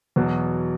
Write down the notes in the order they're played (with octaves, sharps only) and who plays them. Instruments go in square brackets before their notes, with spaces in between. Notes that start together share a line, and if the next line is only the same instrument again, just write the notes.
[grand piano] E2 B2 F#3